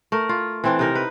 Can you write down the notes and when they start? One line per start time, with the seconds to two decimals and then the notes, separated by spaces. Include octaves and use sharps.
0.12 A3 A#4
0.29 F4
0.64 E3 C4 D4
0.79 C3 D#4 A#4
0.95 B4